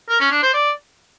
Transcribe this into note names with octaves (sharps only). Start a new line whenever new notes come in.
A#4
C#4
D4
C5
D5